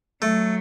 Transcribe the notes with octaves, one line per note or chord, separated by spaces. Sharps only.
F#3 A3